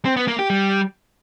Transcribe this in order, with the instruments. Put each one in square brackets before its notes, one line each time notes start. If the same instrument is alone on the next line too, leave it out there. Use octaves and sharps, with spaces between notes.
[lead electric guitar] C4
B3
A#3
G4
G3